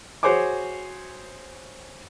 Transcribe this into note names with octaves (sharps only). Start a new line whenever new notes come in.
F#4 G#4 C5 C#5 G#5 D6